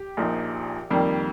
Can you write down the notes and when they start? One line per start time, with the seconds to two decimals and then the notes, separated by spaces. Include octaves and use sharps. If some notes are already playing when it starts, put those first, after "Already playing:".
Already playing: G4
0.17 A#1 A#2 F3 D#4
0.90 F2 D#3 G3 A#3